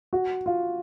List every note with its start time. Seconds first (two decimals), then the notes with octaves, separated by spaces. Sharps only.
0.13 F#4
0.46 F4